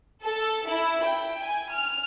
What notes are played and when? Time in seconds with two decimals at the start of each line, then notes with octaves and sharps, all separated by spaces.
0.23 A4
0.67 E4
1.04 G5
1.42 G#5
1.72 F6